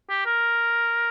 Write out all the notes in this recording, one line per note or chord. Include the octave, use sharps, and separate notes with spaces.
G4
A#4